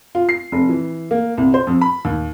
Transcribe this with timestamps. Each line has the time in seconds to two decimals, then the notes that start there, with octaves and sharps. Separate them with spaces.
0.15 F4
0.29 C7
0.52 F1
0.69 E3
1.11 A#3
1.38 C2
1.54 C5
1.67 F2
1.81 B5
2.05 D#2